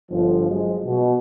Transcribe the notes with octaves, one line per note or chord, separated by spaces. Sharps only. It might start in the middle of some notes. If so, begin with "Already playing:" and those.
G1 F3
F#3 G#3
B2